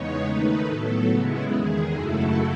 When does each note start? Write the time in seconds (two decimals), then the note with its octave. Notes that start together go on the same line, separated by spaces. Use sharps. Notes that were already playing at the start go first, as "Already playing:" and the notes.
Already playing: E2 C#3 G#3 B3 D#4 C#5
0.24 D#3 A3 D#4 B4
0.66 A2 F#3 B3 A4
1.09 C#3 G#3 B3 E4
1.51 E2 D#3 G#3 G#4
1.93 F#2 C#3 F#3 A3 E4 A4